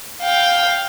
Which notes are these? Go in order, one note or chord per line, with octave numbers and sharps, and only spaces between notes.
F5 G5